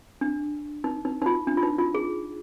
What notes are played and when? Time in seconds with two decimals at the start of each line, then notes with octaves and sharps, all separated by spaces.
0.21 D4
0.84 D#4
1.05 D#4
1.22 D#4
1.26 F4
1.47 D4
1.57 F4
1.63 D#4
1.79 F4
1.94 G#4